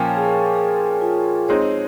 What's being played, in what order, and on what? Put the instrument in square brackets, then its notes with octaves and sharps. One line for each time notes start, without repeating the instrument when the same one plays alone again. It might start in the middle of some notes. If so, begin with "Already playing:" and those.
Already playing: [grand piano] A#2 F3 A#3 C#4 [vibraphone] G5 G#5
[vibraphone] G#4
A#4
G#4
F4
[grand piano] G#3 C4 D#4 [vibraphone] C#5